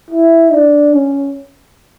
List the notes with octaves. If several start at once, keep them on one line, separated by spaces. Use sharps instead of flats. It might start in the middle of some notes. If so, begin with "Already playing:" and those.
E4
D4
C#4